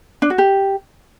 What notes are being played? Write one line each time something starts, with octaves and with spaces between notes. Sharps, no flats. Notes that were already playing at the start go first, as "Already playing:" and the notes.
D4
F#4
G4